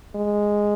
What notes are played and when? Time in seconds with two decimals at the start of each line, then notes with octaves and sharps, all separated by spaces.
0.15 G#3